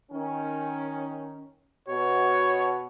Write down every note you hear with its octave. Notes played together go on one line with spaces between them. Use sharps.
D#3 C#4
B2 F#4 C#5